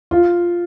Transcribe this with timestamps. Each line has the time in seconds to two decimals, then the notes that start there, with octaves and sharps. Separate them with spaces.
0.11 F4